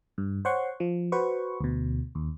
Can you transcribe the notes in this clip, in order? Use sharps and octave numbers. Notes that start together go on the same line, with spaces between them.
G2
C5 C#5 F#5 C6 C#6
F3
F#4 B4 C5 C#6
D2 B2
D#2